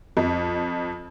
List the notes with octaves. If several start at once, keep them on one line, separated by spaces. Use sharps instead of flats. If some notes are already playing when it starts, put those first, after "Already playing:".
F2